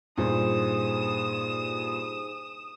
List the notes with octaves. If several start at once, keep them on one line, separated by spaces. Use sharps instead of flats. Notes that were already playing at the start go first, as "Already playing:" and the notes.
G2 A#2 D#4 G#4 C5 D#6 E7